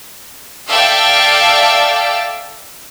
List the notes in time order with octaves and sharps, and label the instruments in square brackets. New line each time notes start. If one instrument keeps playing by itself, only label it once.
[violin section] A4 D5 E5 F5 G5 A5